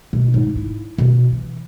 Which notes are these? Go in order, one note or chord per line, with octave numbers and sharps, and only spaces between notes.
B2
G#2
E4
B2
E3